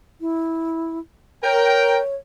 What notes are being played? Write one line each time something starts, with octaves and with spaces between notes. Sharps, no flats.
E4
A#4 C#5 G5